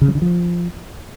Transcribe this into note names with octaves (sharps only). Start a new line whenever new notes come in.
C#3
F#3
D3
F3